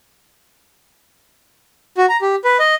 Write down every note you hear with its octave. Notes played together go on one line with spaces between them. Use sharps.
F#4
A#5
G4
B4
D#5